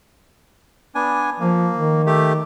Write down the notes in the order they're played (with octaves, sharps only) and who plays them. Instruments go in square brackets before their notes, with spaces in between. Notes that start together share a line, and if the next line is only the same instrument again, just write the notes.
[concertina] B3 D4 G#5
[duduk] F3 [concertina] A#3
[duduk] D#3
[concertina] A3 G4